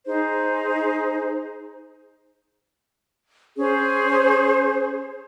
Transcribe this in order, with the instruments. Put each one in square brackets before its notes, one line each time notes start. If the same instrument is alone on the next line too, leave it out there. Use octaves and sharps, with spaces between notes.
[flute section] D#4 G#4 C5
C#4 G#4 C5